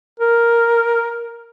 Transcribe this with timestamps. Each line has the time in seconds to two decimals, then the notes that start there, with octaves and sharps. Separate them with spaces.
0.20 A#4